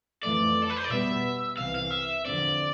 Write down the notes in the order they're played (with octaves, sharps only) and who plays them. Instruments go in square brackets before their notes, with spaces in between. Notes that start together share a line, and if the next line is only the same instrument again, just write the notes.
[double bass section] F2 E3 A3 [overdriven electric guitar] D5
[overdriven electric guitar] A4
B4
C5
D5
[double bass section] B2 G3 B3 [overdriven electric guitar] E5
[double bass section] C2 C3 E3 [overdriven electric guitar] F5
[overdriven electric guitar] F5
E5
[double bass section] E2 D3 F3 C4 [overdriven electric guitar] D5